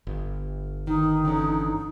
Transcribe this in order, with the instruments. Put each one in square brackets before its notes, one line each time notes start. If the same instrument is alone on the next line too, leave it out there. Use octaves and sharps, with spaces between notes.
[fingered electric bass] G1
[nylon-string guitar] D#3 [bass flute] D#4
[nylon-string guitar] D3 E3 C#4